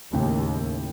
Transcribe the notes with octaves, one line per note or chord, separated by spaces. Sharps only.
D#2 A2 C#3 G5